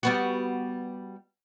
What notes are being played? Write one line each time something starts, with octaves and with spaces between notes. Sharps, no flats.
G3 B3 F#4